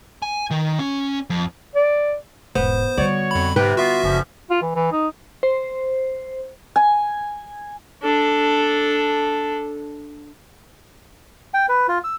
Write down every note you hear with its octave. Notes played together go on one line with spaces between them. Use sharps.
G#5
D#3
C#4
F2
D5
E1 G#2 B3 C5
D3 G3 F#4 C#5 D5 C#6
F2 B5
G#2 C3 B4 G5
B3 F4 F#4 E5
F#1 D3 F3 C#4
F4
E3
E3
D#4
C5
G#5
D4 A4
G5
B4
F4
E6